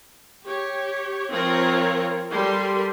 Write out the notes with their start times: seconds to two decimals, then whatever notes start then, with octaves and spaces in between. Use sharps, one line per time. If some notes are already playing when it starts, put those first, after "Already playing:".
0.45 G4 C#5
1.31 F3 C4 F4 A#4 C#5 A#5
2.31 G3 G4 A4 A#4 C6